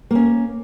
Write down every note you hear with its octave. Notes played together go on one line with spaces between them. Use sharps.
A#3 C#4